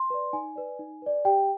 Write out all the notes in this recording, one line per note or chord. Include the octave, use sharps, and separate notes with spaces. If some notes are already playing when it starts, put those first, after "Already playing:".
Already playing: C6
B4 D5
D#4 G#5
B4 D5
D#4
B4 D5
G4 G5